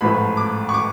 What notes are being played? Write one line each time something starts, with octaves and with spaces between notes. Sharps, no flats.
A1 G#2 F3 A3 B5
D6
C#6
D6